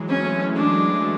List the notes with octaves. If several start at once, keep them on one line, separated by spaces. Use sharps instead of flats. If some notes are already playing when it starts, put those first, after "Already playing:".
Already playing: E3 F#3 G#3
C#4
A3
G#3 D4
A3